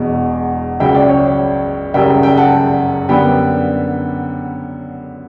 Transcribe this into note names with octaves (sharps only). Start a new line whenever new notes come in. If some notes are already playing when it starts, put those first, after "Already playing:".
Already playing: E1 E2 B2
C#2 C#3 F#3 E5 G5
D5
C#5
F#1 F#2 C#3 G3 E5 G5
E5 G5
F#5 A5
F#2 D3 G3 B3 G5 B5